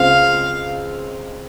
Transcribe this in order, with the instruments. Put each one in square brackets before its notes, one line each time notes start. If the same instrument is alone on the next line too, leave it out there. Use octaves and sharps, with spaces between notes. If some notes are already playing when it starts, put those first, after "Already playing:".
Already playing: [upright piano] C#2 C#3 G#3 C4 F4 [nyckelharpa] F5